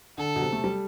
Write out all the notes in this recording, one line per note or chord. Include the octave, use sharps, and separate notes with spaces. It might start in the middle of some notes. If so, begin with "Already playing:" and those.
D3 A4
B2
C3
A3
G3